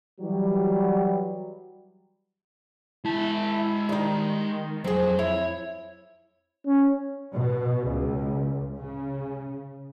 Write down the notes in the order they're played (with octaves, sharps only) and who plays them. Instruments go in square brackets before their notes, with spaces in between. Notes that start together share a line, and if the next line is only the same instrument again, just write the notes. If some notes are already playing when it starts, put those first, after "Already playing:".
[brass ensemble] E3 F#3 G3
[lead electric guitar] G#3 A5 [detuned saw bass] E4
[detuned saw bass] D#3 [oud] G3 D#4
[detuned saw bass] F2 [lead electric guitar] F#3 [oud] C4 G#4
[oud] E4 [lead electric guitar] C#5
[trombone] C#4
[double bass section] B2
C#2
C#3